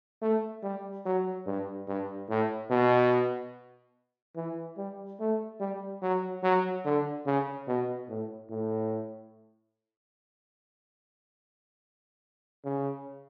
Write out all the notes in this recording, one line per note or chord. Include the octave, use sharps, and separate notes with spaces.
A3
G3
F#3
G2
G2
A2
B2
E3
G3
A3
G3
F#3
F#3
D3
C#3
B2
A2
A2
C#3